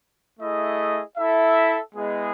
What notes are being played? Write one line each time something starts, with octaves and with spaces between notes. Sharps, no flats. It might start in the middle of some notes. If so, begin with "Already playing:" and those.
A3 E4 G#4 D#5
E4 A4 E5
G#3 B3 E4 G#4 D#5